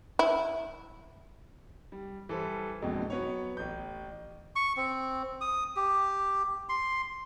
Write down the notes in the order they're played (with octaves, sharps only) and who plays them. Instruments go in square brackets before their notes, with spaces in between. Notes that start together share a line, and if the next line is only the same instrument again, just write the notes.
[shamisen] E4
[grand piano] G3
E3 G3 A4 C5
A#1 F2 G#2 B2
F#3 B3 C#5
A1 G6
[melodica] C#6
C4
D#6
G4
C6